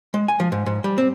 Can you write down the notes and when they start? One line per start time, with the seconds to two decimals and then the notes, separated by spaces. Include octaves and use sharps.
0.14 G#3
0.28 G#5
0.40 F3
0.52 G#2
0.66 G#2
0.84 G3
0.98 C4